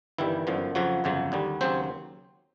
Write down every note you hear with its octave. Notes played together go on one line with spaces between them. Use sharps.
G1 G2 D#3 E3 G3 E4
G1 F#2 D3 F3
F2 C#3 F3 F#3 F#4
G1 F2 C#3 F#3
D#2 D3 G3
D#2 C#3 F#3 C4 C5